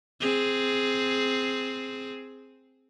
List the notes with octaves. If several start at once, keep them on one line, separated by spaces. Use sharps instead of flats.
C4 G#4